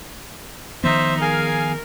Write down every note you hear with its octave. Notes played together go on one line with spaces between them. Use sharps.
D#3 F3 B3 D#4 C5 E5
G#4 A#4 F5 G#5